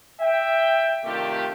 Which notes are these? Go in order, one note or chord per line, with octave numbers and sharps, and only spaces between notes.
E5 G5
C3 D#3 A3 D4 F4 G4